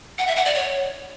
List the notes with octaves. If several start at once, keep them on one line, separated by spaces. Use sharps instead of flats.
F#5
E5
F#5
D5
C#5